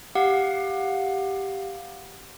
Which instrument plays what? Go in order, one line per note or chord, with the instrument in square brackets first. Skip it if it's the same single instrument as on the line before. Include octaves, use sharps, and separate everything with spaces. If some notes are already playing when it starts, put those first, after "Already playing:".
[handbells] G4 F5 F#5